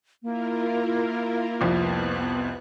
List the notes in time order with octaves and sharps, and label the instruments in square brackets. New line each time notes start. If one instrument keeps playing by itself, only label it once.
[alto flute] A#3 [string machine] E4 F4 A#4
[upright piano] C2 F2 F3 [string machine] B3 F#6